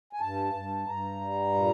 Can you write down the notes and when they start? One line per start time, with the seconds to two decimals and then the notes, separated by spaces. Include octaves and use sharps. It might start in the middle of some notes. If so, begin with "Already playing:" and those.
0.13 G#5
0.21 G2 A5
0.54 G2
0.88 G2 A#5
1.21 G3
1.54 A#2